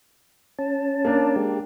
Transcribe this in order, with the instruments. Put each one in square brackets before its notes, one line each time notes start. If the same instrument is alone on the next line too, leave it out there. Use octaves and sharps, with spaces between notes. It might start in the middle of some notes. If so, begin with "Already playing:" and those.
[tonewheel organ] C#4 A5
[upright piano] A#3 D4
[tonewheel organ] G#3 G4